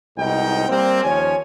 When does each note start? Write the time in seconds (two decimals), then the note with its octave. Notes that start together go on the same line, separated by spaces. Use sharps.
0.17 C2 G#2 B2 D#4 G5
0.68 G3 A#3 C4
1.03 D#2 F3 C#4 C#5 G#5